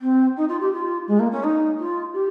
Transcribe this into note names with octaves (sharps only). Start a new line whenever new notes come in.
C4
D#4
F4
G4
F4
G#3
A#3
C#4
D#4
F4
G4